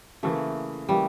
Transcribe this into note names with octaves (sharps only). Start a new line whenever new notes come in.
C#3 E3 A3 A#3
C#3 E3 G3 A#3